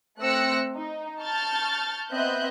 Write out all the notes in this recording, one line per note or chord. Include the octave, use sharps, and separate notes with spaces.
A3 C4 E6 F#6 A#6 C#7
D#4
A5 C#6 F6 G6 A6
B3 C4 D#5 E5 F#6 G6